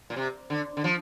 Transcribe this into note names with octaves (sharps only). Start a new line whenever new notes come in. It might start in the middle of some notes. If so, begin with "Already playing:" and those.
A#2
C3
D3
D3
F3